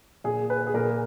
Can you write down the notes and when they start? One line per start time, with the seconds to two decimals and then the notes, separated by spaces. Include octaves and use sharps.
0.24 A#2 G#4
0.50 B4
0.67 G#4
0.74 A#2 A#4